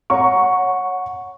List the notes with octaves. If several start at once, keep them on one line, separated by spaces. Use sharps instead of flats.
C#5 F#5 A#5 C#6